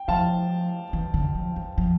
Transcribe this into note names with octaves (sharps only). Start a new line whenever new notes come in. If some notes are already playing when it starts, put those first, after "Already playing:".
Already playing: G5
F3 F5 A5
E3
D3
F3
E3
F3